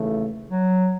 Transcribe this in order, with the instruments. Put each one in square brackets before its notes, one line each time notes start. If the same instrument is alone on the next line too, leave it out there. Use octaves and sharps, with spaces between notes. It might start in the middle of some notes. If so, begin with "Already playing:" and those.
Already playing: [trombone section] D#2 C#3 E3 A3
[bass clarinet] F#3